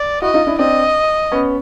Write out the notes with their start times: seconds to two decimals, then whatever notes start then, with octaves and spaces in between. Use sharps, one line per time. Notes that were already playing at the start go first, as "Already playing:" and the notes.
Already playing: D5
0.22 E4 F#4 D#5
0.34 D#4 F4
0.47 D4 E4
0.59 C4 D4 D#5
1.32 B3 C#4